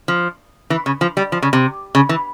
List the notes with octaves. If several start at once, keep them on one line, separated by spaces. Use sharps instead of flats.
F3
E3
C#3
F3
G3
F3
C#3
C3
C#3
E3